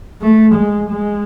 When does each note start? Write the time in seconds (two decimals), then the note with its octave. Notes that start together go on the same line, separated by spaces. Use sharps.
0.22 A3
0.55 G#3
0.90 G#3